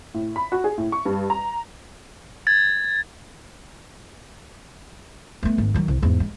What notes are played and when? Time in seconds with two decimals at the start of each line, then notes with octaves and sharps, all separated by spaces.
0.14 A2
0.36 B5
0.52 F#4
0.64 G#4
0.78 A2
0.92 C#6
1.05 G2
1.30 A#5
2.47 G#6 A6
5.43 A3 B3
5.58 G#1
5.74 D#3 F#3
5.88 C2
6.02 E2 G#2
6.20 G#3